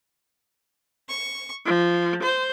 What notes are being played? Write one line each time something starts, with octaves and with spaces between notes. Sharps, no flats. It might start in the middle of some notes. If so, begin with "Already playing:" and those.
C#6
F3
C5